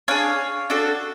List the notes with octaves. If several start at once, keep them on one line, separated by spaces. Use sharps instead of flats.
D4 G#4 C#5 F5
D4 F#4 A4